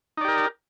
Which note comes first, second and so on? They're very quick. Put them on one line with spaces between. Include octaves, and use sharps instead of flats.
D#4 D5 G4 A#4